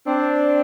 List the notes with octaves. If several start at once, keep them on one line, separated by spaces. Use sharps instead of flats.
C4 D4